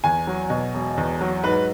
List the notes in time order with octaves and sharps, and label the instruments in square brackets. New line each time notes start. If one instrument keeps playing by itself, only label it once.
[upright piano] E2 G#5
F#3
B2
E1
E2
F#3
G#2 B4